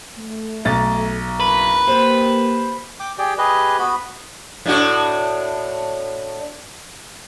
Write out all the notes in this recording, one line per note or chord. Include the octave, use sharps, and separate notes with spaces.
A3
B1 A6
F#1 A#4 B4
A#3 G4 C5
G5 D6
G4 G#4 D5 G5
G4 G#4 B4 D#5
B3 F#4 B4 B5
A2 D4 F#4